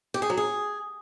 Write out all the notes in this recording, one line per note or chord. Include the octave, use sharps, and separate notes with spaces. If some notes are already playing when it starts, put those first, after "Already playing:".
G4
G#4
F#3
G#4